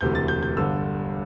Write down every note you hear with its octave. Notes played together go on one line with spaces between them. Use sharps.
E1 D2 C3 E3 G6
A6
G6
G6
G1 G2 D3 E6